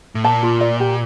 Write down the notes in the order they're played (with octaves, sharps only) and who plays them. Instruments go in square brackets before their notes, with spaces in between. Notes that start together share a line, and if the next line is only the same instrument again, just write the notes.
[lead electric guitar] A2
[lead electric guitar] A#2 [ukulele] A5
[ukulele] F4
D5
G4